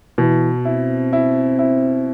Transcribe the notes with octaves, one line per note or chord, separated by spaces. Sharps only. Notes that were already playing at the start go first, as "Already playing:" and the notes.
B2 E3
C4 E4
E4
E4